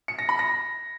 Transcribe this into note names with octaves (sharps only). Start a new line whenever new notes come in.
C#7
A#6
B5
A#6